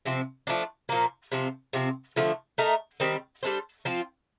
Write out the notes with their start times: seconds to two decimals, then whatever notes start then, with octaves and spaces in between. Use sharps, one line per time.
0.05 C3 F3 C4
0.47 F3 A3 D4
0.89 A#2 F3 A#3
1.32 C3 F3 C4
1.73 C3 F3 C4
2.16 D3 F3 A3
2.58 A3 D#4 A#4
3.00 D#3 G3 C4
3.43 G3 D4 A4 C5
3.85 F3 C4 F4